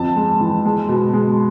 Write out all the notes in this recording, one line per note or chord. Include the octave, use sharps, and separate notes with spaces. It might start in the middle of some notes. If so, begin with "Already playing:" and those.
Already playing: F2 A5
G#3
E3
G#3
B2
G#3